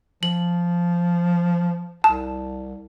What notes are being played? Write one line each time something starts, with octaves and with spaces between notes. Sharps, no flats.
F3 F#7
C2 A5